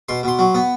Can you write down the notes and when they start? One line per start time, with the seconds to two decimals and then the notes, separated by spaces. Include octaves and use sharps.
0.09 B2 C6
0.23 B2 C6
0.39 F#3
0.55 B3